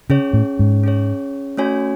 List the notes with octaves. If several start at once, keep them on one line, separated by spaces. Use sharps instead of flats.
C#3 C#4 G#4 C#5
A2
G#2
C#4 G#4 C#5
A3 C#4 F#4 C#5 G#5